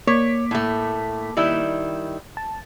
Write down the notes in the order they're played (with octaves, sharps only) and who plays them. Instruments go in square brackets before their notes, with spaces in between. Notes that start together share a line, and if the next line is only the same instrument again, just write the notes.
[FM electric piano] A#3 D6 B6 [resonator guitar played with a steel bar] C#5
[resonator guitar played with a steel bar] A2 A3
D#3 G3 E4
[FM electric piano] A5